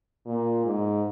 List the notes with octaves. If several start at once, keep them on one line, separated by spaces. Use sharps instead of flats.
A#2
G#2